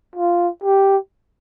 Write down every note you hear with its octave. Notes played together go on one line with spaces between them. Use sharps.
F4
G4